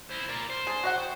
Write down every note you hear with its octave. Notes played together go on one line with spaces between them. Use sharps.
E4 C5
A#4 D5
C5
D4 G#4
F#4 D#5 F#5
G5